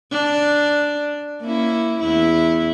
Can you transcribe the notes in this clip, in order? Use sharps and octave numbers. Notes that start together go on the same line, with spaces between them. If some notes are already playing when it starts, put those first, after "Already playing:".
D4
A#3 C#4 E4
E2 E4